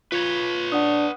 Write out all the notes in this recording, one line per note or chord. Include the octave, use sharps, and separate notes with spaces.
F4 B4 C#5 G#6
D4 F#5 D#6